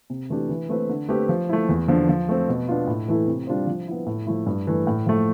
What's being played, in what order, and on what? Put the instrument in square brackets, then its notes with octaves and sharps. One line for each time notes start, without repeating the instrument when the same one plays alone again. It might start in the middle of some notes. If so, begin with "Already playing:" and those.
[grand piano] C3
E3 A3 D4 G4
E3
A3 C4 E4 B4
D3
A3 C4 G4 B4
F3
A3 E4
E2
D3 F3
F3
A3 C4
B2
B3 D4 F4
A2
E3 A3 E4 A4
C3
G3 D4 F4 C5
F3
B3 E4
A2
F3 A3 E4
G2
E3 A3
A2
F3 A3